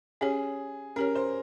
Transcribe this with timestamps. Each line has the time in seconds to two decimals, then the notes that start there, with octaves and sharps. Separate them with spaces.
0.21 C#4 G4 G#4 C#5
0.96 C#4 G4 A#4 C#5
1.15 C5